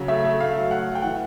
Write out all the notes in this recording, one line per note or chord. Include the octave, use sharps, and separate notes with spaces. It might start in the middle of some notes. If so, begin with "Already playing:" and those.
Already playing: C#3 F#3
A3 E5
A3
A3 F5
F#3
A3 F#5
A3
G5
E3 F#5